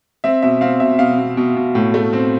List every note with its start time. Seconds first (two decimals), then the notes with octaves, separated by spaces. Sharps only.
0.24 C4 E5
0.42 B2 E5
0.61 C4 F5
0.80 B2 E5
0.99 B2 F5
1.18 B2
1.37 B2
1.56 B2
1.75 A2
1.94 A3
2.13 C4